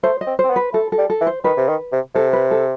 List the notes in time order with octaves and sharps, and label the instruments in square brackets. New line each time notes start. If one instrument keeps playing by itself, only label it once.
[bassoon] A3 [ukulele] C5
[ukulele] D#5
[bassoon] C4
[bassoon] C4 [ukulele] C5
[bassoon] B3
[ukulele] B4
[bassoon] A3 [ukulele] A4
[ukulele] A4
[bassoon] G3
[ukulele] A4
[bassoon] E3
[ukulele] C5
[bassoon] D#3 [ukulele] B4
[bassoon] C3
D#3
C3
[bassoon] C3 [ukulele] A4
[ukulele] B4
A4